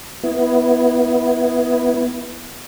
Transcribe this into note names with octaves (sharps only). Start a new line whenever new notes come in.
B3 E4